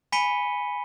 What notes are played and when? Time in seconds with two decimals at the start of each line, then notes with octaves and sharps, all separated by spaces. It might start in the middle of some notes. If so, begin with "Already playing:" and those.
0.12 G#5 B5 B6 C#7 D#7 G7